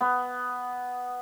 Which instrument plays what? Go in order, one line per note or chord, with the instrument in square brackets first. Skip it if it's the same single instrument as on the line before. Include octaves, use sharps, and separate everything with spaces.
[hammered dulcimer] B3